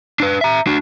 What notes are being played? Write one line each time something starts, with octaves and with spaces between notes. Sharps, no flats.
D4 B4
E5 A#5
D4 F#4